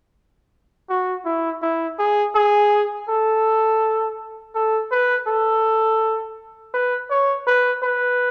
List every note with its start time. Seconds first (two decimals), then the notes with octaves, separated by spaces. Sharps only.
0.89 F#4
1.25 E4
1.62 E4
1.99 G#4
2.35 G#4
3.09 A4
4.55 A4
4.92 B4
5.27 A4
6.74 B4
7.11 C#5
7.47 B4
7.83 B4